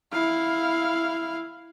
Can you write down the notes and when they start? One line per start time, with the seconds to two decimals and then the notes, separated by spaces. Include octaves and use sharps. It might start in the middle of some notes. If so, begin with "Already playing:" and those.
0.12 E4 F5